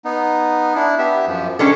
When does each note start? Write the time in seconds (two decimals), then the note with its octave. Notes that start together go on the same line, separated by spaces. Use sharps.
0.05 B3 D#4
0.75 D4 E4
0.98 B3 G4 E5
1.27 F#2 F3
1.59 G#3 C#4 D4 G4 A4